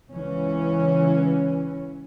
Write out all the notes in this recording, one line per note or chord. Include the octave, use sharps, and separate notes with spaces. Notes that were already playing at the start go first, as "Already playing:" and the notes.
C#2 E3 C#4